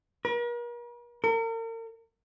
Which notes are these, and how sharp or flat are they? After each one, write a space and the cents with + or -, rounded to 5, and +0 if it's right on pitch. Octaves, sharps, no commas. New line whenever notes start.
A#4 +45
A#4 -40